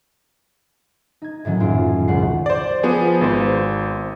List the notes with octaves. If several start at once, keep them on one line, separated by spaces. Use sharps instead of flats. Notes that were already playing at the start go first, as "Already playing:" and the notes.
D#4 G#6
A2 D#3 F#3 C#4
D#1 F#2 F4 D7
E1 C#2 D#3 F#5 C#6 C7
C5 D5
F3 B3 G#4
G#1 C5